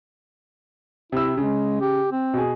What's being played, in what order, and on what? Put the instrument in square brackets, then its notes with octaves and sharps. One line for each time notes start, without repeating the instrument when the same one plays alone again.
[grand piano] C3 E6 [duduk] E4
[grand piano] C#3 [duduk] G#3
[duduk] G4
C4
[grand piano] B2 G#4